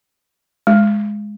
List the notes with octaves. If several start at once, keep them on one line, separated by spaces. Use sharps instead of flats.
G#3